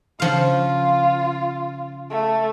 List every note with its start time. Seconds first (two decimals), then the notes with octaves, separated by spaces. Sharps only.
0.20 C#3 F3 F4 F5
2.10 A3